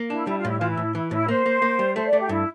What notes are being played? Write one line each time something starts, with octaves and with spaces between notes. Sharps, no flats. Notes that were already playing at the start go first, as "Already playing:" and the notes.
Already playing: A#3
D4 E4
G3 E4
F4
A2 E4
E3 F4
E4
A2
E3 E4
A2 E4
A#3 C5
A#3
A#3
G3
A3 C5
D5
A3
G4
G2 E4